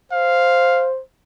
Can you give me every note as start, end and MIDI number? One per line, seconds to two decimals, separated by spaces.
0.12 1.01 72
0.12 0.88 77